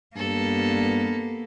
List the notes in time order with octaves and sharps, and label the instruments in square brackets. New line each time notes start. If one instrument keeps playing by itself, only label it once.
[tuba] G2 [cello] A#3 B3 [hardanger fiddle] A4